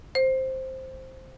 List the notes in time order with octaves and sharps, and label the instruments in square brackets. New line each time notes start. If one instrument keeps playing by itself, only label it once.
[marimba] C5